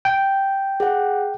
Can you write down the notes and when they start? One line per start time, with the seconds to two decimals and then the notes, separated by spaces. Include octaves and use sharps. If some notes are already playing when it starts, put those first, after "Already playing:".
0.05 G5
0.80 G#4 F#5